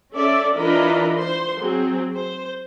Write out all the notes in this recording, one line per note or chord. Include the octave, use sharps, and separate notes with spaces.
C#4 A4 D5 E5
E3 D4 F4 A#4 D#5 B5
C5 C6
F#3 C4 G#4
C5